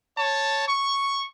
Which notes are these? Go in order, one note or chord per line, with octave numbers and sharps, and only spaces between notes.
C#5 A5
C#6